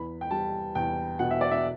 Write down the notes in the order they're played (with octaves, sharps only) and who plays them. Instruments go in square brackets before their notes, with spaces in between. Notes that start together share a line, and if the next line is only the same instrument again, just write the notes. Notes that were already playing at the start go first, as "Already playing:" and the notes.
Already playing: [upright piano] E2 B5
G5
G3 A5
E2 G5
B2 F#5
E5
D5
E5